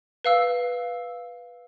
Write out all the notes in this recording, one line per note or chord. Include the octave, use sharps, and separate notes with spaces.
B4 F5 E6